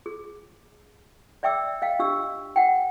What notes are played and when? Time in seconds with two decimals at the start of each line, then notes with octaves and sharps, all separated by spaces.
0.06 G#4
1.43 D5 E5 G5 D6 E6
1.82 D#5 F5 G5
1.99 D4 G4 E6
2.56 F#5 G5